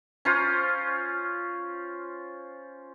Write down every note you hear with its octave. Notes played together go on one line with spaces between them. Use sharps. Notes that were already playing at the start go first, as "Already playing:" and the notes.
C#4 F4 C5